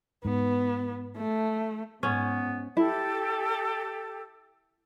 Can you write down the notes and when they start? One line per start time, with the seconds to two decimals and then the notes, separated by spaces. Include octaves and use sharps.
0.25 G#2 B3
1.18 A3
2.03 G#2 B3 C#4
2.77 E4 G4 A4